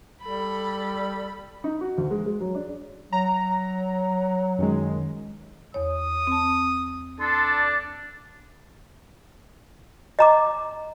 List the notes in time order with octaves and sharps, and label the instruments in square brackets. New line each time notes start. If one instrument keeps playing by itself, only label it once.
[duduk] G3 [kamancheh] A4 B5
[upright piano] D#4
F#4
D2
G#3
G#3
F#3
D4
[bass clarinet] F#3 [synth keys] A#5
[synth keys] F#2 D#3 G#3
[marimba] E2 C#5 [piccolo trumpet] D#6
[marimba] C4 A5
[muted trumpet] D4 [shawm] A4 [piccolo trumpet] C6
[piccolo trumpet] D5
[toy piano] D#5 A#5 D6